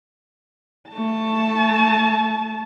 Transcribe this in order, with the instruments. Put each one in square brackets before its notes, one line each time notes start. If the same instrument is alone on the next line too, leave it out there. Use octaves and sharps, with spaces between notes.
[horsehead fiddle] A3 A5